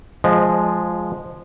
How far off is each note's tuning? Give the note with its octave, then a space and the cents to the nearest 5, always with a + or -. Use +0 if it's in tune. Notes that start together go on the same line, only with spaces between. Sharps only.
F3 +0 G#3 +0 D#5 -25